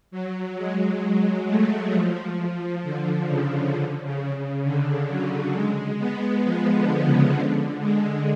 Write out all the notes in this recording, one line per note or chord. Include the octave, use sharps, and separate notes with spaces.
F#3
G#3
G#3
A3
F3
F3
D3
C#3
D3
C#3
C#3
D3
F#3
G#3
B3
F3
D3
C#3
D3
G#3